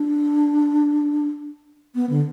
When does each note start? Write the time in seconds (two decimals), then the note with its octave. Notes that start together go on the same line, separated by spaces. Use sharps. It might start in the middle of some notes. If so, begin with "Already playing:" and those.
Already playing: D4
1.95 B3
2.10 D3